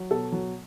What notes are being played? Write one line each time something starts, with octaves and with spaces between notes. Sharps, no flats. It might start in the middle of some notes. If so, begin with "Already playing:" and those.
Already playing: F#3
B2 A4
F#3